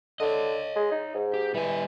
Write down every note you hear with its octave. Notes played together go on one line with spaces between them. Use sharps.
D3 C#5 D#5
G#3
D#4
G#2
G4
E3 G3 G#5